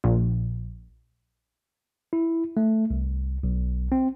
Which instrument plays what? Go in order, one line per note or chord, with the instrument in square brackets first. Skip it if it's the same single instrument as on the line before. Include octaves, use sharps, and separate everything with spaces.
[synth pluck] A#1
[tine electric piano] E4
A3
C2
B1
C4